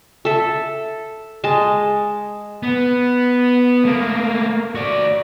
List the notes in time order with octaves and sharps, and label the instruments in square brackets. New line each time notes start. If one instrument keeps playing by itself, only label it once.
[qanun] A4 E5
G#3 A5
[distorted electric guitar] B3
A3 A#3
F#4 D5